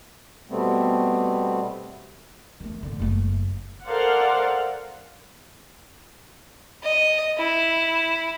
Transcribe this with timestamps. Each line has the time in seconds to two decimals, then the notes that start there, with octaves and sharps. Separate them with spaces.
0.50 B2 G3 A3 B3 C4
2.60 D#3 A3
2.83 A2 D3
2.99 F#1 A3
3.86 A4 A#4 C5 D5 F5 F#5
6.83 D#5
7.38 E4